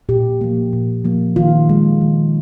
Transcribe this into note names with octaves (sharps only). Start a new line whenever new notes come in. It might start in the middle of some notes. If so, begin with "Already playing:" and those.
A#2 G4
F3 A#3
A#2
F3 A#3
D#3 F4
G#3
D#3